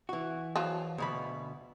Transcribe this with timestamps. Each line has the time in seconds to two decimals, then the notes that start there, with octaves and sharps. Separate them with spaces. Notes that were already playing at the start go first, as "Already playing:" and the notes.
0.09 E3 F#4
0.56 F3 F#3
0.98 D2 B2 B5